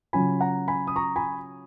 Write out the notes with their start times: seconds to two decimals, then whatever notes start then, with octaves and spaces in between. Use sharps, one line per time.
0.13 C#3 F#3 C#4 F4 G#5 B5
0.41 F#5 A#5
0.68 G#5 B5
0.87 D#6
0.96 A#5 C#6
1.16 G#5 B5